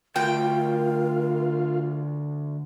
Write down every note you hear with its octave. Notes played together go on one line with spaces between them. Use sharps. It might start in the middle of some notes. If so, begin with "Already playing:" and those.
D2 F4 A#4 G5